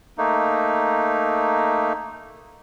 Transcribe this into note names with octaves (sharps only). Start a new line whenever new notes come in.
A3 A#3 D#4